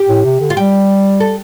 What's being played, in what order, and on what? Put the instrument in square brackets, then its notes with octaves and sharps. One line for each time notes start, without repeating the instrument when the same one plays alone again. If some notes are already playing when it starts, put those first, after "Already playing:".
Already playing: [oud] G4
[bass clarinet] A2
C3
D3
[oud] F4
[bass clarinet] G3 [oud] G4
[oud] A4